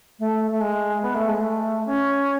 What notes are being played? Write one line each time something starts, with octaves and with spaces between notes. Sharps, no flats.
A3
A3
G#3
B3
A3
G#3
A3
C#4